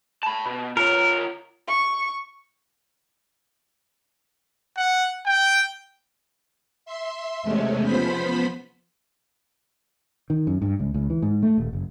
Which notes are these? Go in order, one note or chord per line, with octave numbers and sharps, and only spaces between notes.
A5 B5
B2
F4 A#4 C#5
C#6
F#5
G5
E5 C6
E2 C3 G#3 A3 C#4
F3 B3 C5 B5 B6
D#3
F#2
G2
C#2
C#2
E3
G#2
A3
D#1
F#1